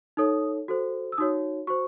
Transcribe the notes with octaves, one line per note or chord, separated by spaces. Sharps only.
D#4 A4 C#5 D#6
F#4 A4 C5
E6
D#4 F#4 C#5 D#6
F#4 C5 C#6